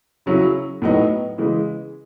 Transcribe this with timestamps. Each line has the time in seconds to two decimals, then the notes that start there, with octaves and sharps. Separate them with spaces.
0.26 C#3 F#3 C#4 E4
0.82 A2 F#3 B3 D#4 F#4
1.38 C#3 E3 G#3